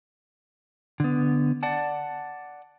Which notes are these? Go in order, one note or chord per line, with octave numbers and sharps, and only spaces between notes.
D3 B3
D5 F#5 A5